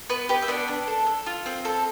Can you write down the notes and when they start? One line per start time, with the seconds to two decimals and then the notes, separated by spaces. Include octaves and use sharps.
0.10 B3 B4
0.29 G4 B4
0.42 E5
0.48 B3 D4 D5
0.68 D4
0.87 A4
1.07 A4
1.26 F4
1.46 C4
1.65 A4